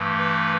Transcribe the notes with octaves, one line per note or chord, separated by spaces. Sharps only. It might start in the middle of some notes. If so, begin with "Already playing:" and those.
Already playing: G2 E3 A3
B4